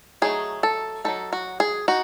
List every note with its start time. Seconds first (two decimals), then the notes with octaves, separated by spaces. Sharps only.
0.22 F#3 A3 D#4 G#4
0.63 A4
1.05 F#3 A3 D#4 A4
1.33 F#4
1.60 G#4
1.88 D#4 F#4